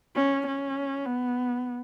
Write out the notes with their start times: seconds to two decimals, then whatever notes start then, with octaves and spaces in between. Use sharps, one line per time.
0.16 C#4
0.47 C#4
1.06 B3